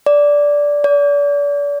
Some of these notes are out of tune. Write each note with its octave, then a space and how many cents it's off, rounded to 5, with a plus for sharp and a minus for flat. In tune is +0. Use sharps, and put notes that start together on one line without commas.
D5 -10
D5 -35